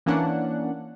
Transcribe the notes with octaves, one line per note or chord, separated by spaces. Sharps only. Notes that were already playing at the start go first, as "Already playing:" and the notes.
E3 A#3 C#4 D4 F#5